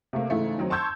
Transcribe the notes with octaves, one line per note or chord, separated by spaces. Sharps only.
C3 A3 A#3
G#2 C#3 E3 A3
D#3 F#3 C4 D#4
A5 C6 C#6 E6 G6 G#6